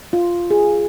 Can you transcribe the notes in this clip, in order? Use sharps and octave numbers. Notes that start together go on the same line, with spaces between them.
F4
G#4